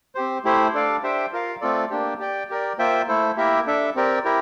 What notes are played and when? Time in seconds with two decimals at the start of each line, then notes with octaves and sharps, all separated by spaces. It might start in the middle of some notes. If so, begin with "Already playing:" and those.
0.15 C4 G4 C5
0.45 A3 E4 G4 C5
0.74 D4 A4 D5 F5
1.02 D4 G4 C5 E5 G5
1.33 F4 A#4 F5
1.61 A3 C4 F4 A4 D5
1.91 A#3 D4 G4
2.20 G4 D5 G5
2.50 G4 A#4 D5
2.78 A#3 F4 C5 E5 G5
3.08 A3 E4 A4 C5
3.37 A#3 E4 G4 A#4 E5
3.67 D4 A4 E5
3.95 C4 G4 A#4 D5
4.25 E4 G4 A#4